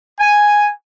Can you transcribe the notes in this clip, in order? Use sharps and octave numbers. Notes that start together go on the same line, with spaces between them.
G#5